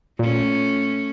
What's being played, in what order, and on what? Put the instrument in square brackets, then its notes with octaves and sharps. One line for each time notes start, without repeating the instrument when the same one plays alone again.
[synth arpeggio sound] A#2 [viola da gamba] A3 C#4